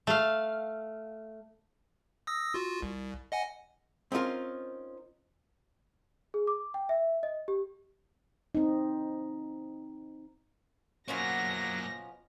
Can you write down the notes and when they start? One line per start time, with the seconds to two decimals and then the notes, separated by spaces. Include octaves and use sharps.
0.07 A3 F5
2.27 D#6 E6 A#6
2.54 F4 F#4
2.82 C2
3.32 D#5 F#5 G#5
4.12 C4 C#4 D#4 F4 A#4
6.34 G#4
6.47 D6
6.74 G5
6.89 E5
7.23 D#5
7.48 G4
8.55 C4 D#4
11.08 F#2 B2 F3 F#3 A#3 C#4 A#6